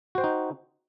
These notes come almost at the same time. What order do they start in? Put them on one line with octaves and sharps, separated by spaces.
F#4 C5 G5 D#4